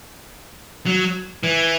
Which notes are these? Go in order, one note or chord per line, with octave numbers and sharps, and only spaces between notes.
F#3
E3